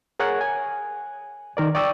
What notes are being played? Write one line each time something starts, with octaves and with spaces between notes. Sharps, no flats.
G#4 A#4 C#5 F#5
G#5
D#3 A#4 D5
D5 G5 C#6 D#6 E6